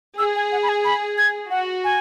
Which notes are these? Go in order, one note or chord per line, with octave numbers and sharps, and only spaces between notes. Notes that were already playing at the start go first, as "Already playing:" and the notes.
G#4 E6
G#5
F#5
B5
G#5
B5
G#6
F#4 F#5
G#5